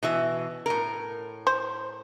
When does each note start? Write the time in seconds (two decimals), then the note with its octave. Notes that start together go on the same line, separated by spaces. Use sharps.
0.03 B2 E3 E5
0.66 A2 A#4
1.47 C5